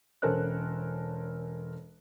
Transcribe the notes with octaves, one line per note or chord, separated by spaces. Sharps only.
E1 C#4 A4 A#4 C5 F#6